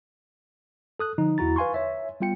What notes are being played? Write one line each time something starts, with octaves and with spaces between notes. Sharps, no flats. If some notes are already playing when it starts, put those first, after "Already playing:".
A4 D#6 F#6
D3 F3 D#4
E2 E4 F#4 A#5 A6
B4 F5 G#5 C6 C#6
C#5 E5
G3 B3 F4 G5 C#7